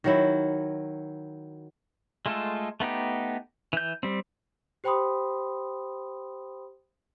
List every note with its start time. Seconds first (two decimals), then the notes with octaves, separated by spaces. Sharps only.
0.04 D#3 F#3 E4
2.26 G#3 A3 F4 A4
2.80 A3 B3 D#4 G4
3.73 E3 G6
4.03 G3 C4
4.84 G4 C5 G5 B5 C6 D#6